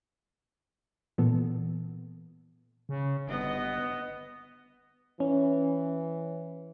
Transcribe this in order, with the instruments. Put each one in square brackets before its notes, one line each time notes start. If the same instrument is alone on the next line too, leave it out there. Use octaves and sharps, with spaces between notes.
[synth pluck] A#2 E3 B3 A4
[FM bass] C#3
[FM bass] G1 [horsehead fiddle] B3 D#5
[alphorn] E3 [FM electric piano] C#4